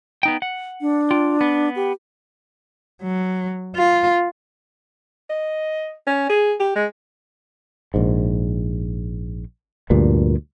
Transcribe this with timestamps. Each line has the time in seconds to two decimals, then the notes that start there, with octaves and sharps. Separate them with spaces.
0.23 B3 D#4 G5
0.42 F#5
0.81 D4
1.11 F4 G5
1.41 B3
1.76 G4
3.02 F#3
3.75 F4
5.30 D#5
6.07 C#4
6.29 G#4
6.60 G4
6.76 G#3
7.94 A#1 G#2
9.90 D2 G2 A#2